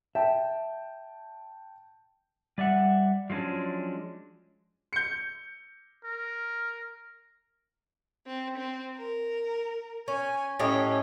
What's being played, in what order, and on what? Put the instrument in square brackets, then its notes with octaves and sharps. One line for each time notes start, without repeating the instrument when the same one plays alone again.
[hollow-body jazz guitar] E5 [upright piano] G5 A5
[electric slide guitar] G3 D5 E5 F#5
F3 F#3 G#3 C#4 D4
[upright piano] G6 C#7
[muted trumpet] A#4
[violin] C4
C4
A#4
[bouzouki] C#4 [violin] G#5
[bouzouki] A2 G4 D#5 [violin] C#4